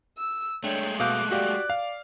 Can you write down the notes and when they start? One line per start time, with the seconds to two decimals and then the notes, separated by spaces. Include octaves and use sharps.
0.17 E6
0.64 G#3 A3 D4 C#5 G5
1.00 B2 F5 D6 F#6 G6
1.31 F#4 G4 D5 F5
1.70 F5